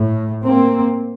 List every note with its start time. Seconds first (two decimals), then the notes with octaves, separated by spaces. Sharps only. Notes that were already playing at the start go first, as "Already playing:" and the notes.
Already playing: A2
0.44 A#3 C4